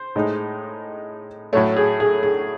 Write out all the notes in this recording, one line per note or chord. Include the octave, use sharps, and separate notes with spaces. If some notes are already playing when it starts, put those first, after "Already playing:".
Already playing: C5
A2 G#3 D#4
A2 F#3 A3 C#5
G#4
G#4
G#4